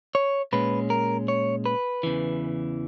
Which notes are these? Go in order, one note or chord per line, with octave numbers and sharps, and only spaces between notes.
C#5
A#2 G#3 C#4 B4
A#4
C#5
B4
E2 C#3 E3